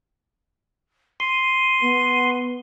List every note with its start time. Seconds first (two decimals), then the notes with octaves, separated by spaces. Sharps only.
1.20 C6 D#7
1.81 B3